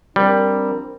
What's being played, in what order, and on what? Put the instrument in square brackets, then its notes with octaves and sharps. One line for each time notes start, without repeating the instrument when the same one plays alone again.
[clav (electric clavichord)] G3 [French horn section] C4 D4 A#4